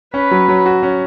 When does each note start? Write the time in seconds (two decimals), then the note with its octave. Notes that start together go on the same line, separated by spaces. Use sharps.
0.14 C#4 B4
0.31 F#3
0.48 F#3
0.66 F#4
0.83 C#4